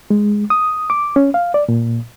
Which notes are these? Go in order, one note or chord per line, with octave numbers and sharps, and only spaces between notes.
G#3
D#6
D6
C#4
F5
D5
A#2